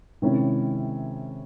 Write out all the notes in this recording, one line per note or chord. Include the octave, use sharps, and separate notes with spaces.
C3 D#3 G#3 C#4 E4